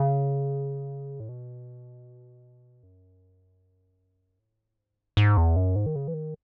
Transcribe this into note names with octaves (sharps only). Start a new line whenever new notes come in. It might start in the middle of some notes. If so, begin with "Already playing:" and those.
Already playing: C#3
A2
B2
F#2
A2
G#2
G#2
E2
F#2
G#2
D#3
C#3
E3
D#3